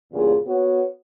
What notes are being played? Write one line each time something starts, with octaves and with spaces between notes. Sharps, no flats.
E2 G2 A#2 C#3 F4 G#4
B3 F#4 C#5